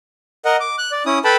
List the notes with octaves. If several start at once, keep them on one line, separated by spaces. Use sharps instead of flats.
A#4 D#5 F#5
D6
F#6
D5
C#4 E4 D#6
A4 B4 G5 A5 B5